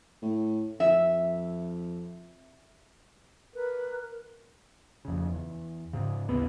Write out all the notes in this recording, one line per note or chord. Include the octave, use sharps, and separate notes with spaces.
A2
F2 E5
A#4 B4
F2 C#3
E2
G#2 C#3
A1 D#2 B3